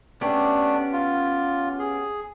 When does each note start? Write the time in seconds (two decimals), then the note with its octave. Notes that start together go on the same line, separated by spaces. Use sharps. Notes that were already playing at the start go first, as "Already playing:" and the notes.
0.21 A3 B3 C#4 D4 G4
0.93 F4
1.79 G#4